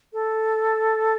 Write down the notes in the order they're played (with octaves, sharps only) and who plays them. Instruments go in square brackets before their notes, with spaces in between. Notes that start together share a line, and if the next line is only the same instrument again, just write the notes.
[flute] A4